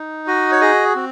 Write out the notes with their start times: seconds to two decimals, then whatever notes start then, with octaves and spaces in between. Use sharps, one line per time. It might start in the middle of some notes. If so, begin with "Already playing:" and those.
Already playing: D#4
0.27 F#4 D#5
0.52 C#5
0.61 G#4 D#5
0.96 C4